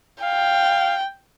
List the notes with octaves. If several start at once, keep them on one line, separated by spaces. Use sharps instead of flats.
F5 G5